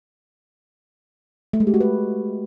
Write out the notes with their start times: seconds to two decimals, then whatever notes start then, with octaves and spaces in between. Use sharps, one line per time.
1.53 A3
1.60 G#3
1.67 G4
1.74 F#4
1.80 B4